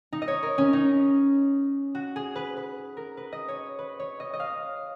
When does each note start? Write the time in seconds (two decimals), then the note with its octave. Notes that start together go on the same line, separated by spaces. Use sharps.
0.12 D#4
0.22 D#5
0.28 C#5
0.43 A#4
0.58 C#4
0.73 D#4
1.95 F#4
2.16 G#4
2.36 B4
2.57 B4
2.97 A#4
3.17 B4
3.32 D#5
3.48 C#5
3.79 B4
3.99 C#5
4.20 D#5
4.33 D#5
4.40 F5